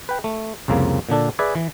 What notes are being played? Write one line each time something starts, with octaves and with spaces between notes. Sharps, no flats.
B4 G5
A3
C2 F2 C#3 A#3
A#2 D3 D4 A4
G#4 B4 D5 E5 G#5
E3